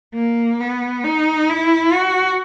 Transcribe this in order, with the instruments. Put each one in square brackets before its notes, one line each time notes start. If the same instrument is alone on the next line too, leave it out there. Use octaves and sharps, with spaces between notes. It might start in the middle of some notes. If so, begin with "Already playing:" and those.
[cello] A#3
B3
D#4
E4
F#4